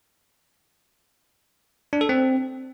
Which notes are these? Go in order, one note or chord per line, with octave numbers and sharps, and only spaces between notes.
D4
A4
C4